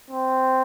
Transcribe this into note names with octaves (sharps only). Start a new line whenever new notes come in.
C4